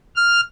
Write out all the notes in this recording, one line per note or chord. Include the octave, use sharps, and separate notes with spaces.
F6